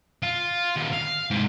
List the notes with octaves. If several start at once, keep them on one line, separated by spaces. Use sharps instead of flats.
F4
D#3 G3
F5
G#2 C3